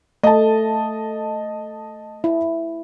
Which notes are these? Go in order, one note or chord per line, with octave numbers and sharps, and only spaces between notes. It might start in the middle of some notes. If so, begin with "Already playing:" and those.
A3 D#5 A5
E4